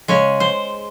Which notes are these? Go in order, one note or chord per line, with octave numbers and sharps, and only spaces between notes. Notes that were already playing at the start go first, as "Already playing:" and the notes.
C#3 G#3 C#5
C5